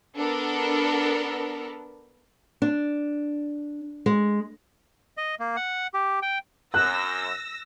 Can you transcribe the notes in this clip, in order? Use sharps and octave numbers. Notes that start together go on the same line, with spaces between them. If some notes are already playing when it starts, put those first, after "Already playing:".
B3 D4 A4 A#4
D4
G#3
D#5
A#3
F#5
G4
G5
F#2 E6 F#6 A#6